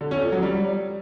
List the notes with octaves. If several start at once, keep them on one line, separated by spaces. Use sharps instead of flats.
D3
C#4
F3
F#3
G3